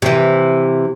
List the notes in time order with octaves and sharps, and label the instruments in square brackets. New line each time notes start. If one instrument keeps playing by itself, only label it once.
[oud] C3 E3